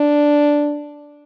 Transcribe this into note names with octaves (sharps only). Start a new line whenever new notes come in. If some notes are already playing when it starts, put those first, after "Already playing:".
Already playing: D4